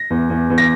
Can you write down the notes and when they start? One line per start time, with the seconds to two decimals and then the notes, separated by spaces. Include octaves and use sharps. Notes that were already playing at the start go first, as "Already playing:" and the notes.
Already playing: A#6
0.10 E2
0.30 E2
0.50 E2
0.58 A#6